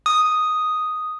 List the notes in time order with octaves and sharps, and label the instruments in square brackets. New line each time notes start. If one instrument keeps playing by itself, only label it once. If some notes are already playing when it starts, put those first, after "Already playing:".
[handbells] D#6